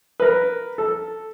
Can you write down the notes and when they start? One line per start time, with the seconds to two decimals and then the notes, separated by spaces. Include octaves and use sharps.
0.20 A#4 B4
0.78 A4